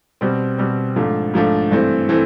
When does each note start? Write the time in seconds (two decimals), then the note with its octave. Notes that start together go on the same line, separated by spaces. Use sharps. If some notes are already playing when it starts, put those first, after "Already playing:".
0.21 B2 G3 C4
0.58 B2 G3 C4
0.96 G#2 F3 A3 D4
1.34 G#2 F3 A3 D4
1.71 G2 E3 A3 C4
2.09 E3 A3 C4